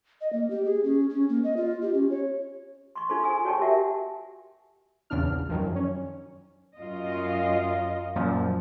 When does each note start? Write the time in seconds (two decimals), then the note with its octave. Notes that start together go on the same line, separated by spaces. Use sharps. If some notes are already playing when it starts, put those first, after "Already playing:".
0.21 D#5
0.33 A#3
0.50 G4
0.65 G#4
0.84 C#4
1.10 C#4
1.29 A#3
1.44 D#5
1.57 F4
1.82 G4
1.94 C#4
2.10 C#5
2.96 C6 C#6
3.09 D#4 F4 G#4 A4 C5 C6
3.24 G#5 D#6
3.45 F#4 C#5 D5 G5 A5 C#6
3.59 G4 A#4 E5 F#5
5.10 A#1 E2 C#3 B3 D4 F6
5.49 F#2 D#3 F3
5.75 C#4
6.78 F#2 F4 D#5
8.16 F#2 A#2 F3